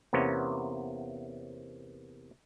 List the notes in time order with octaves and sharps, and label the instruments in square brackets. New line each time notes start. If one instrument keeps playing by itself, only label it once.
[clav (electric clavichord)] E2 C3 A#3 B3 C#4